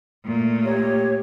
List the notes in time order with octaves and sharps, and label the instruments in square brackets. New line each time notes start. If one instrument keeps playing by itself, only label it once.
[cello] A#2 A3
[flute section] G4 C#5